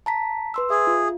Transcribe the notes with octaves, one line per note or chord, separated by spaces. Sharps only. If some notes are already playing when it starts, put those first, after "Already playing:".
A5 A#5 B6
B4 C6 E6
G#4 E5
F4